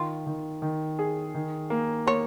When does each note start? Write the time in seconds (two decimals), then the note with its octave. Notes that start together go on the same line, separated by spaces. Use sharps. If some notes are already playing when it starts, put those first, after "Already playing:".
Already playing: D#3 F4
0.27 D#3
0.62 D#3
0.99 G#4
1.34 D#3
1.70 A#3
2.07 A#3 C#5